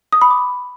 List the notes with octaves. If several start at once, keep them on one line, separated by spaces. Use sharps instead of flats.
D#6
B5
D6